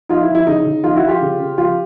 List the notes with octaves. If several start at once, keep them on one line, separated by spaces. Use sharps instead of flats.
F3 D#4 F4
E4
F3
E4
C#3 D#4
C#3
F3 D#4 F4
E4 F#4
F3
F4 G4
C#3
C#3
F3 F4 G4